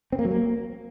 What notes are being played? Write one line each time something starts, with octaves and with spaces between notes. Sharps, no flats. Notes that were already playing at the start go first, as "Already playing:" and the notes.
C4
A#3
F#3
A#3